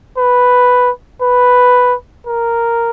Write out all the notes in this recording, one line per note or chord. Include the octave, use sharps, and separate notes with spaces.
B4
B4
A#4